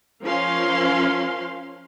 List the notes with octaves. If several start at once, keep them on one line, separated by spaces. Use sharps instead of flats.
F3 C#4 A#4 F5 C6